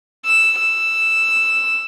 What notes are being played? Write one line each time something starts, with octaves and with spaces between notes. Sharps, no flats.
E6
E6